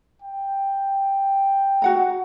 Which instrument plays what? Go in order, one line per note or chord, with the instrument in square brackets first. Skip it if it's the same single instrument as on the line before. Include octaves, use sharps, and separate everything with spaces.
[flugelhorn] G5
[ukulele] F#4 F#5 A#5